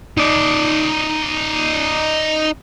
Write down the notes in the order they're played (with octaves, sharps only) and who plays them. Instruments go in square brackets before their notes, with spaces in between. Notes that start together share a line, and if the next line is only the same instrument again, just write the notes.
[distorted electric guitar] D#4 D5